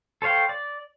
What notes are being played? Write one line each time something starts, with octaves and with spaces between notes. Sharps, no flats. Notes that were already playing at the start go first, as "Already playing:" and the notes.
A4 C5 C#5 F5 G5
D5